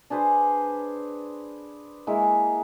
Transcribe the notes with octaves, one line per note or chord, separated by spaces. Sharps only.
D4 G#4 B4 C5
G#3 A#3 E4